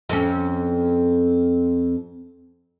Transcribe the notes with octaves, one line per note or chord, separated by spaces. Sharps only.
F2 C#4